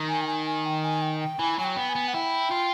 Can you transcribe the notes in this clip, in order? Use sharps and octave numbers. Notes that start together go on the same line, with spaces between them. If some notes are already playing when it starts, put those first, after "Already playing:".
Already playing: D#3
G#5
G5
G#5
G#5
G5
G#5
G5
G5
E3 G#5
F#3 G#5
G5
B3
G#5
B3
F#5
E4 G5
F4